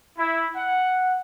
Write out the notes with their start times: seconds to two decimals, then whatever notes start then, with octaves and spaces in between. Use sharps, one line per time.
0.18 E4
0.56 F#5